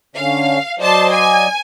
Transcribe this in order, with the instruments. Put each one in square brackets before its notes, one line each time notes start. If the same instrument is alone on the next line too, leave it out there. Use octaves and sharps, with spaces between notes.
[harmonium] D3 C#4 [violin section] F5
[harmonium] F#3 D5 D#5 [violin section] C5 A5 C6
[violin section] G#5